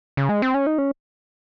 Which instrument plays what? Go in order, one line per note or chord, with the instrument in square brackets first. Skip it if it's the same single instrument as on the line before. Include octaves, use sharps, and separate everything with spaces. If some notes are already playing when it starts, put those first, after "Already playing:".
[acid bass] C#3
G#3
C4
C#4
D#4
C#4